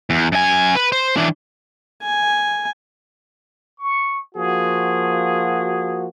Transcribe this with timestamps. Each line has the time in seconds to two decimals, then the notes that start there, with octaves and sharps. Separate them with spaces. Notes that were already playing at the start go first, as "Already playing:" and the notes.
0.10 E2
0.32 F#2 G#5
0.75 B4
0.92 C5
1.17 E3 D4
2.03 G#5
3.79 C#6
4.35 F3 A#3 F#4 G#4